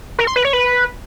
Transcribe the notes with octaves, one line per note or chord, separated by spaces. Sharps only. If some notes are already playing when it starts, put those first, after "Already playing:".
A#4
C6
B4
C#5
B4